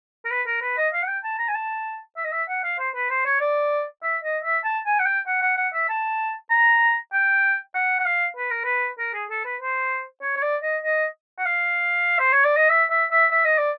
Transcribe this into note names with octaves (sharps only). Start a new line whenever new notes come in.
A#4
B4
A#4
B4
D#5
F5
F#5
G5
A5
A#5
G#5
A5
E5
D#5
E5
F#5
F5
C5
B4
C5
C#5
D5
E5
D#5
E5
A5
G#5
F#5
G5
F#5
F#5
F#5
E5
A5
A#5
G5
F#5
F#5
F5
B4
A#4
B4
A#4
G#4
A4
B4
C5
C#5
C#5
D5
D#5
D#5
F#5
F5
C5
C#5
D5
D#5
E5
E5
E5
E5
D#5
D5